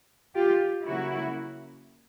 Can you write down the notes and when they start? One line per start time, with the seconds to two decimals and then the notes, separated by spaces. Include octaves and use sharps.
0.35 F4 G4
0.86 C#3 F#3 A#3 C#4 E4 F#4